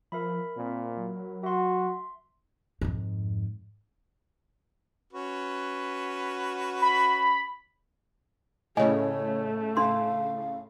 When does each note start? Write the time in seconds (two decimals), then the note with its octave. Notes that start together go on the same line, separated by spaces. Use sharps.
0.12 F3 A#4 E5 B5
0.57 A#2 C4
0.97 F#3
1.43 F#4 E5 C6
2.81 F2 G#2
5.13 C#4 F#4 B4
6.82 B5
8.77 A2 C#3 A3 C#5 D#5 G#5
9.77 D4 F5 C6